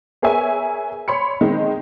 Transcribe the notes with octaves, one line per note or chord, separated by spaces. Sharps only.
B3 G#4 A#4 C#5 E5 G#5
C#5 B5 C6 C#7
D#3 G#3 C4 D#4